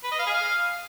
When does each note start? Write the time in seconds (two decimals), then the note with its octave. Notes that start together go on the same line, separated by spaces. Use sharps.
0.04 B4
0.11 D#5
0.19 F5
0.26 G#4
0.34 F5